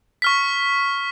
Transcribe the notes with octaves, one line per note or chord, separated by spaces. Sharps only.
C#6 F6 B6